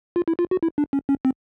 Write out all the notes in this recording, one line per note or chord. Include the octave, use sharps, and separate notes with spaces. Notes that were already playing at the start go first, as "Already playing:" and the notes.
F4
E4
F4
F#4
E4
D4
C#4
C#4
C4